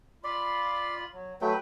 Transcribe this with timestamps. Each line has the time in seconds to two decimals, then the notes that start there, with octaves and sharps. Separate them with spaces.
0.24 F4 D5 B5 C6
1.12 F#3
1.41 F#3 A3 B4 G5 G6